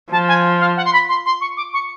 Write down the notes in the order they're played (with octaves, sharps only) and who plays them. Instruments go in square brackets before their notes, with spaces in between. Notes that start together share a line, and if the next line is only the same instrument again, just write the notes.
[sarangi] F3 [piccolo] A5
[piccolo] G#5
F5
F#5
C6
B5
C6
C6
C#6
D6
C#6